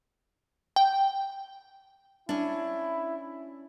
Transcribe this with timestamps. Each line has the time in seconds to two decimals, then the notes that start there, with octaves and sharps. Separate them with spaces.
0.76 G5
2.29 C#4 D4 E4